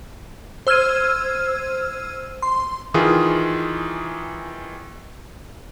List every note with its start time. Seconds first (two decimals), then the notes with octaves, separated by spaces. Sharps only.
0.67 C5 E6 F6 G#6 D#7
2.42 C6
2.94 D#3 E3 F4 G#4